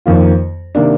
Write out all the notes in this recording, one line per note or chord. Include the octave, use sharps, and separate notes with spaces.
F2 D#3 A#3 F4
C3 D#3 A#3 D4